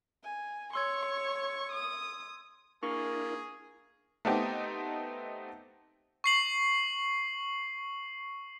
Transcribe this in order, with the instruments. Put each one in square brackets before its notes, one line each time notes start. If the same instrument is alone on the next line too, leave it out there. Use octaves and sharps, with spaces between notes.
[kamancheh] G#5
[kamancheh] C#5 C#6 [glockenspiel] C6 E6 G#6
[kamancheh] D#6
[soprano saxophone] A#3 [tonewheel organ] D4 E4 A#4 [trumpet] G#4 [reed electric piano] C#6
[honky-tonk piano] A3 B3 C4 D#4 G4
[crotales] C#6 C7 F#7